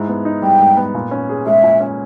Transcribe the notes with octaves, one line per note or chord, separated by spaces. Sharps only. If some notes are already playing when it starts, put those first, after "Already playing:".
Already playing: G#2 E4
B3
D#4
G3 G5
G#2
B3
A#2
C#4
G#4
G#3 E5
A#2
C#4